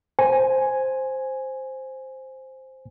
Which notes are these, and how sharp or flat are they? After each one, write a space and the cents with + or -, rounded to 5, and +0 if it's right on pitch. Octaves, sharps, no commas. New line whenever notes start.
C5 +0 G#5 +0